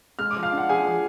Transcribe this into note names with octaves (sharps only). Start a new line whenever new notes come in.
G#3 F6
D6
F3
F5 F6
D4
F#5
F3 G#4 G#5
F3